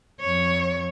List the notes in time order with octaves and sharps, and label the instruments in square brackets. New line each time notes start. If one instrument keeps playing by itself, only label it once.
[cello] F2 C#5